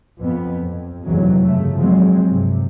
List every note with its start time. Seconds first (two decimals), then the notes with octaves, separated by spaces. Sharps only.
0.21 F2 B3
0.61 F2
1.04 F1 E2 D3 E3 F#3 G#3
1.41 G2 C#3 A3
1.75 F3 F#3 G#3 C4
2.28 G2 C3